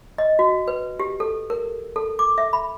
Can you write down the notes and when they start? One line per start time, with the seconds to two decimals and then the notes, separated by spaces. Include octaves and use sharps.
0.18 D#5
0.39 F#4
0.68 B4
1.00 G4
1.20 A4
1.50 A#4
1.96 A4
2.19 D6
2.38 E5
2.53 B5